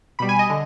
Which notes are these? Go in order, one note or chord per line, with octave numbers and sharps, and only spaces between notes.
B2 G3 B5
G#5
D#5
D3